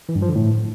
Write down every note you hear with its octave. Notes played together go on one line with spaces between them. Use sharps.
E3
G2
F3
D3
A2